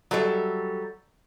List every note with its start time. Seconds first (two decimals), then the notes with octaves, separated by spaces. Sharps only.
0.11 F#3 G3 A4 D5 E5